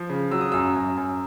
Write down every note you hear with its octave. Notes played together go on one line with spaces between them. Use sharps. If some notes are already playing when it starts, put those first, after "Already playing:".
Already playing: F3
C#3
F#3 E6
D#6
F#2 E6
F#2
F#2